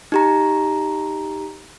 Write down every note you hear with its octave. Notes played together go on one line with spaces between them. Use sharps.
D#4 G4 A#5